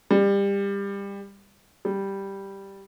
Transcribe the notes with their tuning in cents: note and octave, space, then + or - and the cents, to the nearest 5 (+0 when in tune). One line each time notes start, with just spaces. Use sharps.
G3 +25
G3 +0